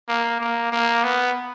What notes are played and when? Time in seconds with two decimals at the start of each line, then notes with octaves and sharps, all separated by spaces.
0.08 A#3
0.40 A#3
0.72 A#3
1.03 B3